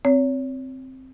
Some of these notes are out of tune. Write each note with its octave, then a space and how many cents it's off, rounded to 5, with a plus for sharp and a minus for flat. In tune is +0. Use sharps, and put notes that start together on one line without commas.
C4 +0 C#5 +30